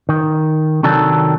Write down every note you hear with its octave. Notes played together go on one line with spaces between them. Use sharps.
D#3
C3 D#3 F#3 D4 A4